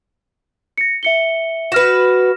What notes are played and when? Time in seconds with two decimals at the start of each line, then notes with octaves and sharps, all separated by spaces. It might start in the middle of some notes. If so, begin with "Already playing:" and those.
0.78 A#6 C#7
1.03 E5 C#7 G7
1.72 F#4 B4 F6 A#6 E7